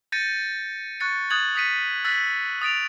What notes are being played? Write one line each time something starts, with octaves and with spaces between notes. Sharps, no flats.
G6 A6 A#6 C#7 D#7
C#6 F#6 A6 C#7
D#6 F#6 G#6 A6 F#7
D#6 F#6 B6 C#7 D#7
E6 F#6 A6 B6
D#6 A6 D7 F7